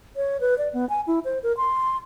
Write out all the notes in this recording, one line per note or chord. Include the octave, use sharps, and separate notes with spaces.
C#5
B4
D5
B3
G#5
E4
C5
A#4
C6